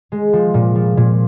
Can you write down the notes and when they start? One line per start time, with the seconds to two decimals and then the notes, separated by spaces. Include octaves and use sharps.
0.12 G#3
0.33 F3
0.54 A#2
0.75 F3
0.97 A#2